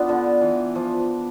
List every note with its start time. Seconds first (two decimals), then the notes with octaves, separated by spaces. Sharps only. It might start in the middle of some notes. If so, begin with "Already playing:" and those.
Already playing: B3 D4 F4
0.09 D3
0.41 E3
0.75 F3